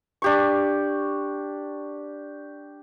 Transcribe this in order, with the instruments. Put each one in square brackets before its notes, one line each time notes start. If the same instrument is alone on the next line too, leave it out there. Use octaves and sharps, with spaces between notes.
[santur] D4 G4 C#6